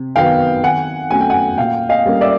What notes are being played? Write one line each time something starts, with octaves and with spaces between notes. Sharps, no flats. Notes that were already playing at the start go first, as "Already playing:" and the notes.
Already playing: C3
D#3 F#3 B3 F5 G5
D#3 F#5 G#5
F#3 A3 C#4 G#5
G5
F#5 G#5
A#2 F5 G5
D#5 F5
G3 A#3 C#4
D5 E5